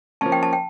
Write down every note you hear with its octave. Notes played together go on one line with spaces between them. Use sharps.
F3 A#3 C#4 A5
G5
A5
G5